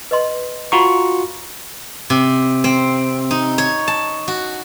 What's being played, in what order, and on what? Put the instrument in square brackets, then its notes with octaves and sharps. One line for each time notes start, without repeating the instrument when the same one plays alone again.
[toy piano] B4 D#5 C6
[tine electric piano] F4 F#4 C#6 [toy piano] A#5 B5
[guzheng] C3
C4
D#4
C#5
A5
F#4